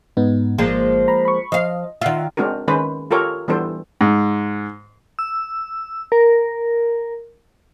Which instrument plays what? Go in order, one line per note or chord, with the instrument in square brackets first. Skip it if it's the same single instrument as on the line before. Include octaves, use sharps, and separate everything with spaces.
[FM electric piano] G#2 B3 D#4
[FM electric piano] G#1 [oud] F3 G#3 A#3
[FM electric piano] A#5 B5
B5 C#6
[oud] F3 F5 [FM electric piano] D#5
[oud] D#3 F4 [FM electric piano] E5 F#5
[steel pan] G#3 C4 D4 F#4 A#4
D#3 G#3 C#4 B4 C5
F4 G4 A4 A#4 C#5
E3 G3 B3 D4 A4 C5
[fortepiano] G#2
[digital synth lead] E6
A#4